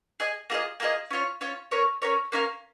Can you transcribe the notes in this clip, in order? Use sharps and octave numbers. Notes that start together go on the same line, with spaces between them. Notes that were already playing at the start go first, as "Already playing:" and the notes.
G#4 D#5 G#5
A#3 F4 G#4 D#5
A#3 F4 G#4 D#5
C#4 F4 C#5
C#4 F4 C#5
C#4 A#4 C#5
C#4 A#4 C#5
A#3 C#4 A#4 F5